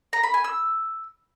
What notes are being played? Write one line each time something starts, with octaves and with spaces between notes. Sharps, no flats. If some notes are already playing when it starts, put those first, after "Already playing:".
A#5
B5
G#5
E6